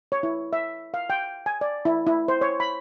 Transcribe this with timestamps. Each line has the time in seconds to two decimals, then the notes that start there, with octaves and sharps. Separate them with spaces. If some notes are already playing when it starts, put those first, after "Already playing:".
0.12 C#5
0.23 E4
0.53 E5
0.94 F5
1.10 G5
1.46 G#5
1.61 D5
1.85 E4
2.07 E4
2.28 C5
2.41 C#5
2.60 B5